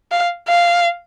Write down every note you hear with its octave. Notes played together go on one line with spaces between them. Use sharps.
F5
F5